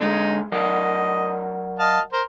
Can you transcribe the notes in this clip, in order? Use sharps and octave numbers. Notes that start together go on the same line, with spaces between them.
D3 G#3 D#4 G#4
F#3 A#4 D5 D#5
D#5 F5 A5
A#4 C5